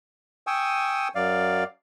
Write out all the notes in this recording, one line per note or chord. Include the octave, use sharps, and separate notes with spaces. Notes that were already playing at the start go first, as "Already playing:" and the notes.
G5 G#5 C#6 D#6 E6
F#2 F#3 D5 F5